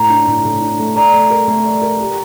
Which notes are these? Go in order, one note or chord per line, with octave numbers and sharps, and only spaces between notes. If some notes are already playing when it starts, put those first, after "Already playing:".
Already playing: A2 A#5
D4
A2
A2
D4
A3
D5 A#5
A3
A#4
A3
D5
A#4
G4